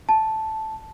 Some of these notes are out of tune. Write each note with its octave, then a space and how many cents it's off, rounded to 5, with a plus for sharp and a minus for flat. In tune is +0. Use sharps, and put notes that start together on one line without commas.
A5 -5